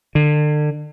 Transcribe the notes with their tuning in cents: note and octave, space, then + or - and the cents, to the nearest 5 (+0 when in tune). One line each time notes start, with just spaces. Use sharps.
D3 +35